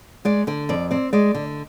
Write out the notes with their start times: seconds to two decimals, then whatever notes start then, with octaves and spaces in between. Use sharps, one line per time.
0.25 G#3 D5
0.47 D3 D5
0.69 F2 D5
0.91 C4 D5
1.13 G#3 D5
1.35 D3